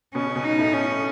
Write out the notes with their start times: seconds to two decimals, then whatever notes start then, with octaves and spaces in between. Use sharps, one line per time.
0.14 B2 C#4
0.25 C#3
0.36 B2
0.44 D#4
0.59 A2
0.74 C#4